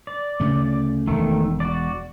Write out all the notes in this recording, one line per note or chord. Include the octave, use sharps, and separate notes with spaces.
D5
D2 C#3 A3
E1 D#3 A3
F#4 D5